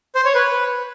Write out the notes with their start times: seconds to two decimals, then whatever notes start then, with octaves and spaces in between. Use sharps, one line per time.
0.15 C5
0.25 C#5
0.35 B4